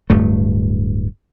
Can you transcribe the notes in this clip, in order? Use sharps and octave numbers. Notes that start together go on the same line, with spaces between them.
D1 G2 A3